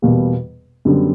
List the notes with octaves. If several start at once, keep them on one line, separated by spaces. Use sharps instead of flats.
E2 B2 G3 A#3
F#2 D3 G3 B3